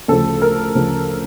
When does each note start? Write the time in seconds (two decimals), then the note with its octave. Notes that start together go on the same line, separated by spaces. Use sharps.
0.08 D2 C#3 F3 A4
0.42 A#4
0.75 D2 C#3 F3